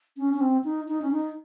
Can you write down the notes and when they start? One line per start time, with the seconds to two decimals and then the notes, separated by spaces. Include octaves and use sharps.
0.17 C#4
0.34 C#4
0.41 C4
0.64 D#4
0.88 D#4
1.02 C#4
1.12 D#4